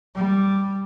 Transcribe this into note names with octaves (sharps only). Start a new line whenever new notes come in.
G3